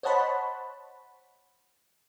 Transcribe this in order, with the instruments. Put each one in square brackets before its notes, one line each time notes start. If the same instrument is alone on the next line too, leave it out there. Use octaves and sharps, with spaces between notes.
[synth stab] C5 C#5 D#5 F#5 A5 B5